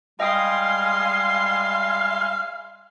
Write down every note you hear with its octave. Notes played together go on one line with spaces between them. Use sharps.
G3 G#3 D#5 F5 G5 C6 D#6